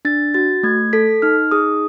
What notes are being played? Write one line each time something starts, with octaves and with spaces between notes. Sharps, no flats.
D4 A6
F#4 A6
A3 G#6
A4 B6
D#4 F6
G#4 D#6